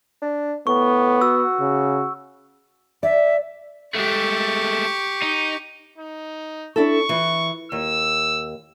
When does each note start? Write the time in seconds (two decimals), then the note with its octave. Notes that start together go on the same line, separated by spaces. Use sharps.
0.22 D4
0.67 A2 B3 C#6
1.22 F#4 E6
1.60 C#3
3.03 D5 E5
3.95 G#3 A3 G4 C#6
5.22 D#4
5.98 D#4
6.76 D4 E4 A4 C#6
7.09 E3
7.72 D#2 E6